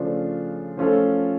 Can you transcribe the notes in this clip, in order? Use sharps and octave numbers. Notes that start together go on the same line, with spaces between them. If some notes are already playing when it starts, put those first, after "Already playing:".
Already playing: C#3 F3 A3 D4 F4
F3 A3 C#4 F4 A4